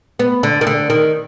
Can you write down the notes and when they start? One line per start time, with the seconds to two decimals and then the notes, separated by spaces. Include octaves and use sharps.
0.19 B3
0.43 D3
0.61 D#3
0.67 D3
0.90 D#3